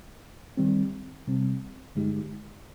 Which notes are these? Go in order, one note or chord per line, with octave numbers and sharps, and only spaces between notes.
D#3 G3 C4
C3 G3 C4
G2 D3 G#3 D#4 G4